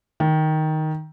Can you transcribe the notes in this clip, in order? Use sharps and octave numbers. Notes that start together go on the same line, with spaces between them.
D#3